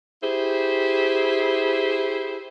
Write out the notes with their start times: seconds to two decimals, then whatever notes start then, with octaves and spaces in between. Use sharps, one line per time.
0.23 E4 G4 G#4 C5